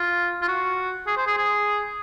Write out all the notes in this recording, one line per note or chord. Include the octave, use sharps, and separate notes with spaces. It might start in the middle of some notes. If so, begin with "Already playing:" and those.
Already playing: F4
F4
F#4
G#4
C5
G#4
G#4